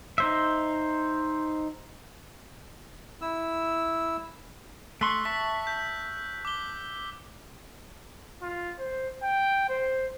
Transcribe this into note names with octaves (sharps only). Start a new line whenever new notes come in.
D#4 C5 E5
E4 E6
A3 C6 C#6 E6 F#6 B6
E5 A5 C#6 B6
G6
D6 G7
F4
C5
G5
C5